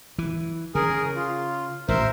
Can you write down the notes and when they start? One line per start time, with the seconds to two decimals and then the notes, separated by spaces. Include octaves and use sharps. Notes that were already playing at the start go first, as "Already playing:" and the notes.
0.19 E3
0.75 C#3 G#4 A#4
1.16 F4
1.89 A1 A#4 C5 E5